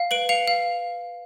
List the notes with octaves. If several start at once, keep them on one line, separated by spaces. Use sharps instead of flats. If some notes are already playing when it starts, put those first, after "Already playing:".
Already playing: F5
B4 D7 F#7
F5 C#7 F7
F5